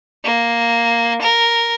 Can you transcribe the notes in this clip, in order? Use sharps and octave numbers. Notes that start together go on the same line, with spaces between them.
A#3
A#4